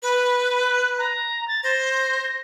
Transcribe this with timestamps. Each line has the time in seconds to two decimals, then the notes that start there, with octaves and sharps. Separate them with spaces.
0.03 B4
0.70 F#6
0.98 A#5
1.48 A6
1.64 C5 A#6